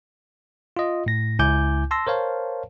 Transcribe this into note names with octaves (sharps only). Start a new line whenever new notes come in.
F4 D#5
A2 A#6
C#2 E4 G#5 D6 G6
A5 C6 E6 A#6
A#4 C5 C#5 F5 A5